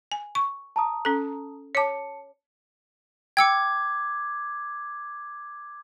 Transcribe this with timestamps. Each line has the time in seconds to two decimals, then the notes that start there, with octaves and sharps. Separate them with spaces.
0.12 G#5
0.35 C#6
0.76 A5 A#5 D#6
1.05 C#4 A4
1.75 C#5 A5 D6 C#7
3.37 G5 D6 E6 G#6 C#7